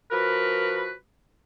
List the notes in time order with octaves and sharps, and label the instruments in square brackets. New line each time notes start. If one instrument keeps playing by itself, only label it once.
[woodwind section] F3 F#4 A#4 B4